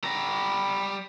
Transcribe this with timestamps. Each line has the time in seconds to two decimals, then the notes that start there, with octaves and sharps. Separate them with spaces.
0.04 G3 A#5